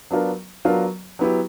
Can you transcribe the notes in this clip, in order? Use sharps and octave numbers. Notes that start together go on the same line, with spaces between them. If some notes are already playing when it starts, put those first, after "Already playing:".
F#3 B3 D4 F4 A#4
F#3 B3 D4 F4 A#4
F#3 B3 E4 G4